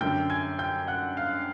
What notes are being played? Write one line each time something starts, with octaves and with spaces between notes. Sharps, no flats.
F#2 D3 G5 G6
G#5 G#6
G5 G6
F#5 F#6
F5 F6